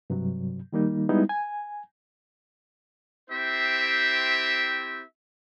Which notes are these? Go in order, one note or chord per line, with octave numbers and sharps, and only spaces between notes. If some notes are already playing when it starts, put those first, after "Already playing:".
G2 C3 F#3
D#3 G3 A#3 D#4
G3 G#3 B3 D#4 E4
G#5
C4 E4 G4 C5 E5